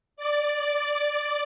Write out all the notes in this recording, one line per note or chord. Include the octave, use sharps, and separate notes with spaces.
D5